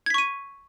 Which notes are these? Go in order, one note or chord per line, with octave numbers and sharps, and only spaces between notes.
C#6 G#6 B6 D#7